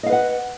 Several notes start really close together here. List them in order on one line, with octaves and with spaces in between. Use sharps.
D#5 F5 B4 F#5